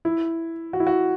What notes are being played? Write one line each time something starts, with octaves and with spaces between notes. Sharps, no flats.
E4
F#4
E4
F#4